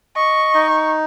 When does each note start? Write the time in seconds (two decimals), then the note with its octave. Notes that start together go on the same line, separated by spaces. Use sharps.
0.16 D#5 C#6
0.54 D#4